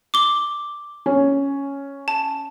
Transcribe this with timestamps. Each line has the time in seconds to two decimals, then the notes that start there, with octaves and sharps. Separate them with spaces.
0.14 D6 G7
1.06 C#4
2.08 A5